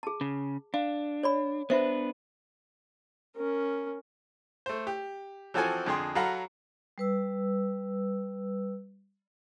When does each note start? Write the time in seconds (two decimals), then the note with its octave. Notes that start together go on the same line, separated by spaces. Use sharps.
0.03 G#4 A5
0.21 C#3
0.74 D4 F5
1.23 C#5 D5 B5
1.70 B3 D4 B4 C5 E5
3.37 C#4 A#4
4.66 A3 C5
4.87 G4
5.54 E3 F3 C4 F#4 A4 G#5
5.86 F2 D3 G#4 G5 C6
6.15 F#3 A4 F5 F#5 A#5 B5
6.98 G3 B4 E6